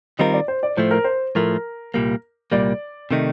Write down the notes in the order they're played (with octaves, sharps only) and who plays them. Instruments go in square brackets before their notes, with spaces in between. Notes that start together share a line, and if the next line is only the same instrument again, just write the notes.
[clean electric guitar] D#3 G3 C4 F4 A#4 [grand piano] D#5
[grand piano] D5
C5
D5
[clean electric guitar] A2 F3 A3 [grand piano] C5
[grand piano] A#4
C5
[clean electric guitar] A2 F3 A3 [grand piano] A#4
[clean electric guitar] C2 A#2 G3 A#3
[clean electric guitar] C2 A#2 G3 A#3 [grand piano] D5
[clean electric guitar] C3 D#3 A3 D#4